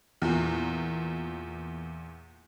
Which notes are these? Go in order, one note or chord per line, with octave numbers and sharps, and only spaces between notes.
E2 A#2